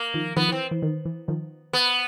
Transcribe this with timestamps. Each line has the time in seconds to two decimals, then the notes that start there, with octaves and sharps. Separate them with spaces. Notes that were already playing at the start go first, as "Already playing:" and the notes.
Already playing: A#3
0.14 D#3 F3
0.37 D#3 F3 B3
0.48 E3 C4
0.71 E3
0.82 D#3
1.05 E3
1.28 D#3 F3
1.73 B3